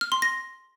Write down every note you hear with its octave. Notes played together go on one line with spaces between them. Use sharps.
F6
C6
A#6